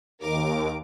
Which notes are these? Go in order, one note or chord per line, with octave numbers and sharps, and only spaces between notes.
D#2 A#4 D6